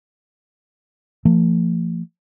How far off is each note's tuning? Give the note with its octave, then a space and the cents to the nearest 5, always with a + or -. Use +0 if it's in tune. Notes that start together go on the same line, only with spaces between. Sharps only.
F3 -30 A3 +45